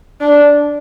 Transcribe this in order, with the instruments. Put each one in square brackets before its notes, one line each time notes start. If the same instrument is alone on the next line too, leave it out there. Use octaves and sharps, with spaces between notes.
[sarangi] D4